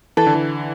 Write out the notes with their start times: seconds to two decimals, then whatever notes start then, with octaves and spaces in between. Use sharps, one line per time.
0.17 E3 A4
0.27 D3
0.35 E3